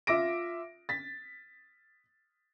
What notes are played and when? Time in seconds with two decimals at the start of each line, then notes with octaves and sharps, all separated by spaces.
0.07 F4 E5 D6 A#6 D7
0.89 A6 B6